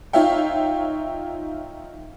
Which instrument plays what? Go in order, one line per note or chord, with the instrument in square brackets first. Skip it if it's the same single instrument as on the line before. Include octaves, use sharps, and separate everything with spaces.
[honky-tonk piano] D#4 F4 C#5 E5 F5 G5